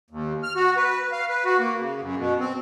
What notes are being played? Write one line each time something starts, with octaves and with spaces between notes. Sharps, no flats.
D#2
F6
F#4
B4
F5
B4
F#4
A#3
C#3
F#2
B2
C4